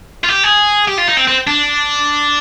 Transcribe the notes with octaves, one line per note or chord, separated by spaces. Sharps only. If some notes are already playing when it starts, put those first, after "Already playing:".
F4
G4
G#4
G4
F4
D#4
C4
C4
D4